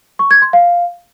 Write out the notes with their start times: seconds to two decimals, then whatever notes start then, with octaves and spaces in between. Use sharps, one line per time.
0.19 C#6
0.31 G#6
0.42 C6
0.53 F5